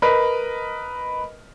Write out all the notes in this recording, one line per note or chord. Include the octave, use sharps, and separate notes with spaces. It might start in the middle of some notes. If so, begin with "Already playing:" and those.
A#4 B4 D#5